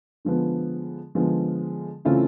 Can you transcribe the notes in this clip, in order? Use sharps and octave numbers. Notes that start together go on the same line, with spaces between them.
D3 F3 G#3 B3
D3 F3 G#3 B3
C#3 E3 A3 C4 F4